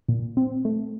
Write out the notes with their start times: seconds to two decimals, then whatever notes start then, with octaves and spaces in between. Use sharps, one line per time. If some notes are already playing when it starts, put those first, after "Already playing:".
0.08 A#2
0.37 C4
0.65 A3